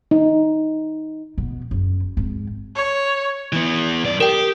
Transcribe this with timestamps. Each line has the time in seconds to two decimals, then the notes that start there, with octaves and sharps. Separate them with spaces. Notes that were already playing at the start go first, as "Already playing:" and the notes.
0.11 D#4
1.38 B2
1.71 F#1
2.17 G#1
2.76 C#5
3.52 E3 B3
4.05 F#2 D5
4.20 G4 A#4 G5